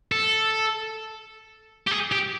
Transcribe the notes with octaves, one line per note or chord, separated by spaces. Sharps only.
A4
G4
G#4
G4